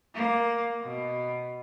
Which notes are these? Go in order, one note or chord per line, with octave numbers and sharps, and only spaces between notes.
A#3
B2